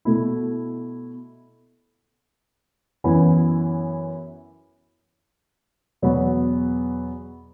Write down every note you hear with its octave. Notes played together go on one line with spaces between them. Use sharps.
B2 A3 E4
F#2 E3 B3 E4
E2 B2 F#3 B3